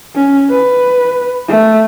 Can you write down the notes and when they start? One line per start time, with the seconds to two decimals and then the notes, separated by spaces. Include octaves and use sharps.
0.15 C#4
0.50 B4
1.48 A3